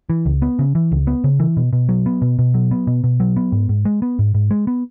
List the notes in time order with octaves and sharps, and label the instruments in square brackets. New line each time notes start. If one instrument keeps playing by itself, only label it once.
[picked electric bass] E3
C#2
B3
C#3
E3
C#2
B3
C#3
E3
B2
B2
F#3
B3
B2
B2
F#3
B3
B2
B2
F#3
B3
G#2
G#2
G#3
B3
G#2
G#2
G#3
B3